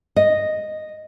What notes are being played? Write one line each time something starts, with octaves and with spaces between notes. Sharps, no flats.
D#5